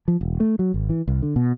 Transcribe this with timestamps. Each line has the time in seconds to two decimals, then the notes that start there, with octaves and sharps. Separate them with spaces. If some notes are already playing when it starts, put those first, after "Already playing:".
0.08 F3
0.21 E1
0.40 A3
0.59 F#3
0.74 G#1
0.90 E3
1.08 C2
1.22 D3
1.36 B2